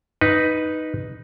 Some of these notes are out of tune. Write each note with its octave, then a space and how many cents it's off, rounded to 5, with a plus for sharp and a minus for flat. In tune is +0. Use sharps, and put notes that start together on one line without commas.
D#4 +0 B4 -5